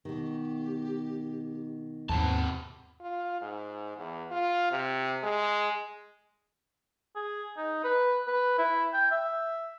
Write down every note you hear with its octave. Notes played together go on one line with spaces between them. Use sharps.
B2 D#3 G4
D#2 G#2 C3 F5 A5 B5
F4
G#2
E2
F4
C3
G#3
G#4
D#4
B4
B4
E4
G5
E5